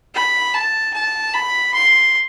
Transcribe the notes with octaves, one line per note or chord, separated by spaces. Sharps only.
B5
A5
A5
B5
C6